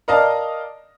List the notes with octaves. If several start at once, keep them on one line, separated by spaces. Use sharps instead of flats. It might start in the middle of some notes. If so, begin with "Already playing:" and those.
A#4 D5 D#5 F5 A5 A#5